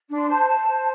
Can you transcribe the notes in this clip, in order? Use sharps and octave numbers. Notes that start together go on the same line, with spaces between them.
D4
C6
C5 A5
C5
C5